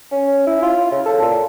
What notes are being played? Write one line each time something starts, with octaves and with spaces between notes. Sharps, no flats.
C#4
E4
F4
C#3
A4
A#2